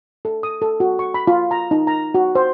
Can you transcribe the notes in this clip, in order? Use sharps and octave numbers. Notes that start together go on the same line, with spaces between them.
A4
D#6
A4
F#4
C#6
B5
F4
A#5
D#4
A#5
F#4
C5